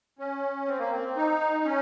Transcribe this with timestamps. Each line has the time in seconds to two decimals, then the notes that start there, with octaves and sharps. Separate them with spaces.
0.19 C#4
0.67 C4
0.79 A#3
0.91 C4
1.16 D#4
1.65 C#4